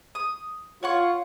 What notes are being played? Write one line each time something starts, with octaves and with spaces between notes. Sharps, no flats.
D#6
F4 C#5 F#5 C#6